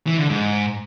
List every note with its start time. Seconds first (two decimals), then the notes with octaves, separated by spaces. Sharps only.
0.07 E3
0.18 D3
0.30 G#2